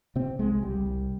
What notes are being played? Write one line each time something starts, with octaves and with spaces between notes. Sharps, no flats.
C3 C4
C2 G#3
C2 G3
C2